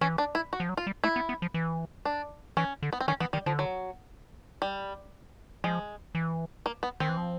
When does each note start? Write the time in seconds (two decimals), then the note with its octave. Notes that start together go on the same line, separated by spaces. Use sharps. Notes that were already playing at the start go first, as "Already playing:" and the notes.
0.01 E3 C#4
0.18 D4
0.35 E4
0.53 F#4
0.60 F3
0.69 F#3
0.77 F4
0.87 G3
1.04 A3 E4
1.16 B3
1.29 B3
1.42 F3
1.54 E3
2.05 D4
2.57 E3 C#4
2.83 D3
2.93 B3
3.01 C4
3.08 D#3 C#4
3.20 E3 B3
3.33 D#3 G3
3.46 D3 F3
3.59 F#3
4.62 G3
5.64 F3 G#3
6.15 E3
6.66 A#3
6.83 B3
7.00 D#3 C4
7.09 E3
7.17 F3